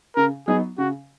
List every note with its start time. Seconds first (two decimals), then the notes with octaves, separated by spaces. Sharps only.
0.16 C#3 A#4
0.48 F#3 B3 D#4 G#4
0.78 C#3 F#4